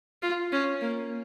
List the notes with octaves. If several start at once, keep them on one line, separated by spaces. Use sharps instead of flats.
F4
C#4
A#3